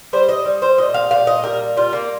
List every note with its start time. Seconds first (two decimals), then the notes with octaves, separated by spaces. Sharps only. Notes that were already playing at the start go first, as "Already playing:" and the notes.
0.13 G3 C5
0.29 D#5
0.45 G3
0.62 C5
0.78 A#2 D#5
0.94 F5
1.11 A#2 F5
1.27 D#5
1.43 G3 A#4
1.77 G3 F4
1.93 A#3